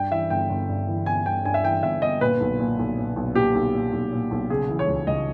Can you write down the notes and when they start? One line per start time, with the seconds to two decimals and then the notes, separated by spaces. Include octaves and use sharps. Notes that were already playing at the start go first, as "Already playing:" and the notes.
Already playing: G2 G5
0.11 E3 E5
0.30 G1 G5
0.50 G1
0.68 G2
0.87 E3
1.06 G1 G#5
1.26 G1 G5
1.45 G2 G#5
1.54 E5
1.64 E3 G5
1.83 G1 E5
2.02 G1 D#5
2.21 A#2 B4
2.40 B1
2.59 A#2
2.79 B1
2.98 A#2
3.16 B1
3.35 A#2 G4
3.55 B1
3.74 A#2
3.93 B1
4.12 A#2
4.31 B1
4.50 C#3 G#4
4.69 E3
4.79 C#5
4.87 C#2
5.07 C#2 D#5